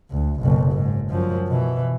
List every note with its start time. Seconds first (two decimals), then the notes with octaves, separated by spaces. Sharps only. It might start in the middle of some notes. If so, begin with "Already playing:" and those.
0.10 D2
0.40 F#1 B1
0.71 G#2
1.10 F#2 F3
1.48 B2 E3